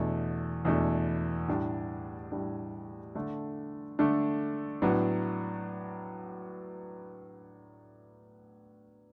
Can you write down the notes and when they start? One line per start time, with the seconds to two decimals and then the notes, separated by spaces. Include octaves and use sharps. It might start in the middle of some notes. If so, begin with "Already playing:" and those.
Already playing: E2 B2 A3 D4
0.65 E2 B2 A3 D4
1.48 A2 G3 D4
2.32 A2 G3 D4
3.15 D3 A3 D4
3.99 D3 A3 D4
4.82 A2 F#3 B3 D4